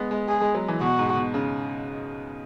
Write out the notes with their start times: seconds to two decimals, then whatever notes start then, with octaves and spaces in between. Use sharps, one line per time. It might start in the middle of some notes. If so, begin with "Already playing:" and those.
Already playing: G#3 B3
0.11 G#3
0.29 G#4
0.41 G#3
0.55 F#3
0.68 E3
0.81 B2 F#4
0.99 G#2
1.16 B2
1.34 C#3